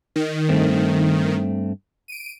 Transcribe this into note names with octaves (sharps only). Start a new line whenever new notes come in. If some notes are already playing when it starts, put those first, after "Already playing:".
D#3
G2 A3 C4
D7 D#7